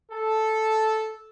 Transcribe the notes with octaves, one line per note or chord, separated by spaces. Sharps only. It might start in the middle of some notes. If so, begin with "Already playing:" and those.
A4